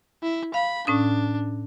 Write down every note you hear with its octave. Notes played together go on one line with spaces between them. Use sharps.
E4
F5 B5
A2 C#4 D4 D#6